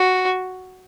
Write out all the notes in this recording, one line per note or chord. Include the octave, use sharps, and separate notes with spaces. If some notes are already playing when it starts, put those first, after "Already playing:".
Already playing: F#4